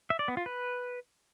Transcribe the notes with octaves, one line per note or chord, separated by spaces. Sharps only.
E5
D5
B3
F4
B4